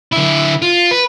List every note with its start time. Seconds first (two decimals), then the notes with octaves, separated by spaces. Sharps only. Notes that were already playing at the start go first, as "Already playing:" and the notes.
0.13 D3 E4
0.62 F4
0.91 B4